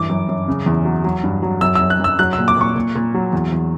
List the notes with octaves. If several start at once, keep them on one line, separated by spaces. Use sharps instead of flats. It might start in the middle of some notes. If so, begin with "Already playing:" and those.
Already playing: G2 E3 D6
F#2
F#2
C#3
E2
F#3
F#3
G2
F#3
F#2 E6
E6
F#2
F#6
F#2 E6
F#3 F#6
E6
A#2
D6
A#2 C#6
A#2
A#2
F#3
E2
E2